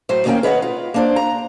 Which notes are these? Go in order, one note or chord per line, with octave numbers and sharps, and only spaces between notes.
A2 F#3 C5
D#2 D#3 A#3 C#4 A#4 G5
B4 C#5 D#5 E5 F#5
F4
A#3 D4 C5
A#5